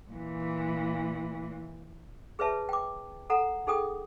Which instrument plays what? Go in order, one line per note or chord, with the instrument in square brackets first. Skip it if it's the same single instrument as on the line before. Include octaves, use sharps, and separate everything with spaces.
[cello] A#2 E3
[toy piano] G#4 B4 C#5 E5 A5
G5 D6
A4 F#5 A#5
D#4 G#4 A4 G5 D#6